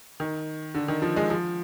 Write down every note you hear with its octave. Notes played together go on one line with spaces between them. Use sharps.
D#3
D3
D#3
F3
G#3
F3